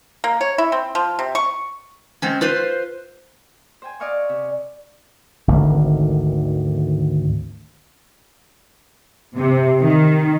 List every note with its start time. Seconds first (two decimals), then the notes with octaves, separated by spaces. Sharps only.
0.24 A#3
0.41 C#5
0.58 E4
0.72 C4
0.95 F3
1.19 C3
1.35 C#6
2.22 G#3 C4 C#4
2.41 F4 B4 C5
3.82 C5 G5 G#5
4.00 D5 D#5 F5 G#5 C#6
4.29 C3
5.48 G#1 D2 D3 D#3
9.37 C3
9.81 D#3